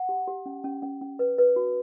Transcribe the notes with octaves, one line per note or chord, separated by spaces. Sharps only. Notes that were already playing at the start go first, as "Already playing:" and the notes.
Already playing: F#5
G4
G4
C#4
C#4
C#4
C#4
B4
B4
F#4